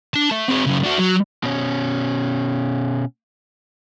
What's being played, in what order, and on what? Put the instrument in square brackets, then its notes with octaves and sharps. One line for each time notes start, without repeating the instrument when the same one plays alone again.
[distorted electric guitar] D4 A5
A3
C4 G#4
F#2 C#3
D4 F#4
F#3
[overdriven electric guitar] B2 C#4